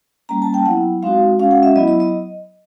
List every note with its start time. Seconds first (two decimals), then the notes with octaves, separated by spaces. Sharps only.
0.29 G3 A#3 C#4 A#5
0.42 A5
0.54 G5
0.66 F#3 B3 E4 F#5
1.02 G#3 C4 D#4 F#4 F5
1.39 G#3 C#4 F#4 F5
1.51 F#5
1.63 E5
1.76 F#3 B3 E4 D#5
1.88 D#5
2.00 D#5